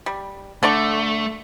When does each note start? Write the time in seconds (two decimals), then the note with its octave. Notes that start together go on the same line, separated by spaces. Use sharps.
0.06 G3
0.63 D3 A3 D5 C#6